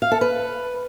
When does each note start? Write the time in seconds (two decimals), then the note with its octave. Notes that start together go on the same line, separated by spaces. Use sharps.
0.02 F5
0.12 A4
0.21 B4